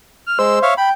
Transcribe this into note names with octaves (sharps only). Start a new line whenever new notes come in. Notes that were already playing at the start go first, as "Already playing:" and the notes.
F6
G#3 C5 E6
C#5 E5 F5
G5 B5